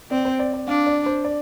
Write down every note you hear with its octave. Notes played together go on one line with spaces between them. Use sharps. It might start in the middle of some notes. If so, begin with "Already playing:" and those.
C4 D5
C5
D5
D5
D4 F5
D5
C5
D5